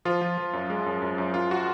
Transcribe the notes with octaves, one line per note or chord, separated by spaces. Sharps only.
F3 F4
F3
F3
F#2
G#3
F#2
F#2
F#2
F#2 F4
F#4